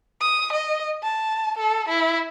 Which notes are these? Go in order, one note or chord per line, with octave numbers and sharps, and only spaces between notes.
D#6
D#5
A5
A4
E4